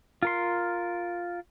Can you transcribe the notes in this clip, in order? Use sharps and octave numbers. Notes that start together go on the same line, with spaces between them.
F4 A#4 C6